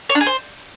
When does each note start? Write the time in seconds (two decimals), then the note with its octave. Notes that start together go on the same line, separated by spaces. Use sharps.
0.09 C#5
0.15 D4
0.21 G#4
0.26 C5